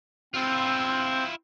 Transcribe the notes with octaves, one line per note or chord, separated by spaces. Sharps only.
C4 E4 F4